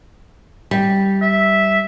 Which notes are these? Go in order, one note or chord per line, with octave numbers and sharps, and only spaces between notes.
G3
E5